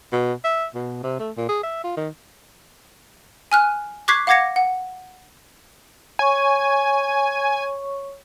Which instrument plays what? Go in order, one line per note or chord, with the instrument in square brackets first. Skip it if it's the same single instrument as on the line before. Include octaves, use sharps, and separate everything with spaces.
[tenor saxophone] B2
E5
B2
C3
A3
A#2
G#4
E5
F4
D#3
[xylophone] G#5 F6 F#6
C#6 D6 F#6 G#6 B6 C7
F5 F#5 D6 G#6 A#6 C#7
F#5
[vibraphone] C#5 C#6 [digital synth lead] G#5